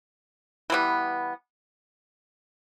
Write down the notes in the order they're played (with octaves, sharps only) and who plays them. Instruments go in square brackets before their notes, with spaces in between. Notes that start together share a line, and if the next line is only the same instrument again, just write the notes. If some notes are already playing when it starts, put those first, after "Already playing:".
[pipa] E3 G3 B3